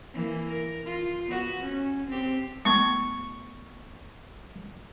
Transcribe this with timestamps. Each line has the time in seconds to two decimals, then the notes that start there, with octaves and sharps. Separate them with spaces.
0.13 E3 A#3
0.49 A#4
0.85 F4
1.27 B3 F#4
1.61 C#4
2.07 C4 G4
2.65 A3 B3 C#6